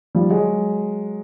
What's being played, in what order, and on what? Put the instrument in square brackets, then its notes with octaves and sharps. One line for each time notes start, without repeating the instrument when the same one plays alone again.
[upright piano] F3 G3
F#3 G#3